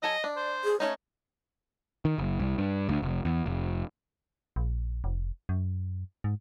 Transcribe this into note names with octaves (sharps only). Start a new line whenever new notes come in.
F#3 A4 D#5 G#5
D4 D5
C5
G#4
A3 C#4 D#4 C#5
D#3
F#1
C2
G2
D2
F1
E2
F1
A#1
F1
F#2
G#2